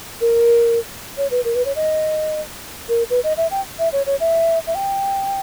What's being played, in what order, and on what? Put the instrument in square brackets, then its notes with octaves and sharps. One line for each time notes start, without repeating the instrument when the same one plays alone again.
[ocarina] A#4
C#5
B4
A#4
B4
C#5
D#5
A#4
B4
D#5
E5
G5
E5
C#5
C#5
E5
E5
G5